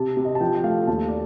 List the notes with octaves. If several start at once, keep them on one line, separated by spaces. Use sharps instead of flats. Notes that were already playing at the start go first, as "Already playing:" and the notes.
Already playing: C3 A5
C3
D#5
A5
F3 G5
G5
A3 F5
D#2 A5
D5